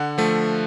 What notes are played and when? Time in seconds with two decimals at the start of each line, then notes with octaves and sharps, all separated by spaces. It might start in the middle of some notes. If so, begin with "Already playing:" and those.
Already playing: D3 F#5
0.18 F3 A3